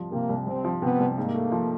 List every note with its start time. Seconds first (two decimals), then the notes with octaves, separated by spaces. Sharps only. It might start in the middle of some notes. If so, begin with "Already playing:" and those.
Already playing: C2 F3
0.11 C3 A#3
0.29 C2
0.46 C2 C4
0.64 F3
0.82 C3 B3
0.99 C2
1.17 G#2 A#3
1.34 A3
1.52 F3